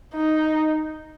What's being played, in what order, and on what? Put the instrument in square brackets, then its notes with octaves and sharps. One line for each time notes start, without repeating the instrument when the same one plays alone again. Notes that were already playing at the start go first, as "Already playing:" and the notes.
[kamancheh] D#4